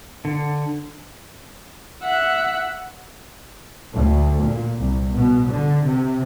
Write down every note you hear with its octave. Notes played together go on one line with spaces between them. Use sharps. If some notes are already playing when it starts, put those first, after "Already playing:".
D3
E5 F#5
D2
A#2
C2
B2
D3
C3